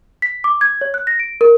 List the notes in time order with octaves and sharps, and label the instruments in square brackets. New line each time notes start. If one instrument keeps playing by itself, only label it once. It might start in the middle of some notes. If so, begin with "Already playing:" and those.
[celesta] B6
D6
G#6
C#5
F#6
A#6
D7
A#4